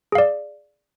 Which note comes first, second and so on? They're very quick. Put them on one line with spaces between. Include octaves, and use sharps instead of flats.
G#4 F5 D5